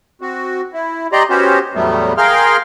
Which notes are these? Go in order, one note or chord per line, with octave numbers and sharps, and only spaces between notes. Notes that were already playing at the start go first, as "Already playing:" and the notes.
C4 F#4
E4
G4 D5 D#5 A#5 C6
B3 C#4 F#4 G4 C5
E2 A2 F#3 G3 A3 B3
G#4 A#4 F5 G5 C6 F6